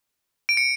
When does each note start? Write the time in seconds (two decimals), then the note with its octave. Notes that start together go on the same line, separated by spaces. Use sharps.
0.49 D7
0.57 C#7